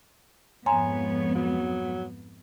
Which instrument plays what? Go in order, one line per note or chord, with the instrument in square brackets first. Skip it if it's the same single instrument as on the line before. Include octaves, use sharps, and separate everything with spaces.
[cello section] F2 G#2 B3 [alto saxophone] C#5 [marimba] G#5 A#5 C6
[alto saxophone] F#3